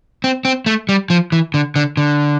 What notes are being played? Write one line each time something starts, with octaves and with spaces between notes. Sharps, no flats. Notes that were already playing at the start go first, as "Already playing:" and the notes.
C4
C4
A3
G3
F3
E3
D3
D3
D3